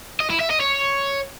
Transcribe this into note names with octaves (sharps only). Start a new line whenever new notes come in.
D#5
E4
E5
D#5
C#5